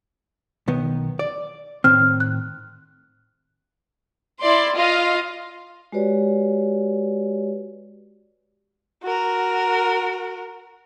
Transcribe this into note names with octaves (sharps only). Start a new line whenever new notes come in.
B1 D#3 B3
D5
A2 D#3 C4 F6
F#6
E4 D5 C6
F4 D#5 F5
G#3 F#4 G4 B4 C#5 D5
F#4 A#4